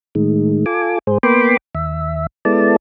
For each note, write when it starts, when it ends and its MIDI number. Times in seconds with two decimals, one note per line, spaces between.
0.15 0.65 45
0.15 0.65 51
0.15 0.65 56
0.66 0.99 65
0.66 0.99 69
0.66 0.99 80
0.66 0.99 86
1.07 1.18 44
1.07 1.18 68
1.07 1.18 72
1.23 1.57 58
1.23 1.57 59
1.23 1.57 79
1.23 1.57 83
1.23 1.57 84
1.23 1.57 86
1.75 2.26 39
1.75 2.26 76
2.45 2.76 56
2.45 2.76 59
2.45 2.76 64
2.45 2.76 69
2.45 2.76 74
2.45 2.76 81